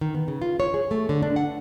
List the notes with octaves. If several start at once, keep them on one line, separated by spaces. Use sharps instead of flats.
D#3
B3
C#3
F4
C#5
G#4
A3
D3
D4
F#5